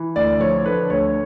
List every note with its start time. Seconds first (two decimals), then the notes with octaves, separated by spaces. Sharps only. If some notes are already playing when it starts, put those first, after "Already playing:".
Already playing: E3
0.15 D2 D5
0.40 F3 C#5
0.66 D3 B4
0.90 D2 C#5